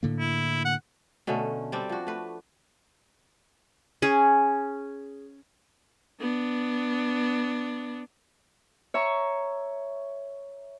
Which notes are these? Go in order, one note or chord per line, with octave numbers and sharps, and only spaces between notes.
A2 D3 A#3
E4
F#5
B2 D3 A3 C#4
G3 C4 D4
F3 F#4
A3 B4
C#4 G#4
B3 D4
C#5 E5 A#5 C#6